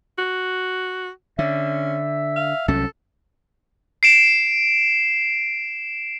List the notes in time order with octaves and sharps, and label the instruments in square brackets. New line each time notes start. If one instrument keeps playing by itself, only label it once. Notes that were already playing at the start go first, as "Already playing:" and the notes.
[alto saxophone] F#4
[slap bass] D3 [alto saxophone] C#4 [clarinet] E5
[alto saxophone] F5
[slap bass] C2 F#3 C#4 [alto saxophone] A4
[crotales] C7 D7 E7